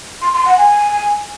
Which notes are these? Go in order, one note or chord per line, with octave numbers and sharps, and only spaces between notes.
C6
C6
F#5
G#5